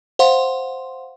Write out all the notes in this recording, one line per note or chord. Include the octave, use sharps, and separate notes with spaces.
C5 F5 F#5 C6